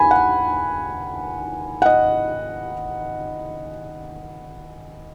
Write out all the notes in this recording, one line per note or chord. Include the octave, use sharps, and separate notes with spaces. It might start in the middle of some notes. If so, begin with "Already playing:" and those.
Already playing: D#2 D#3 G#5 B5
F#5
F#5
D#5